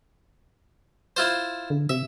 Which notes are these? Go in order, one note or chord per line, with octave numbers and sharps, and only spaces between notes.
E4 F4 C5
D3
C3 E5